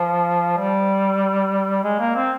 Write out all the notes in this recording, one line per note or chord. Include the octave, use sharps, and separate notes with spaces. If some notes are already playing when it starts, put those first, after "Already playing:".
Already playing: F3
G3
G#3
A#3
C4